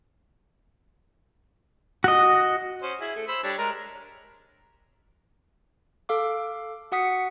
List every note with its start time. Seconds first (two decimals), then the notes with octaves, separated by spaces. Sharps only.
2.04 F#4 D#5
2.82 C#4 C5
3.01 E4 G#4
3.16 A3
3.28 C5 B5 E6
3.43 G3 D4 C#5
3.58 G#3 A#4
6.09 A4 F5 D6
6.92 F#4 F#5 D#6 B6 C#7